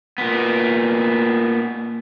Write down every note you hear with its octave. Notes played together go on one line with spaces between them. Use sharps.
A#2 B3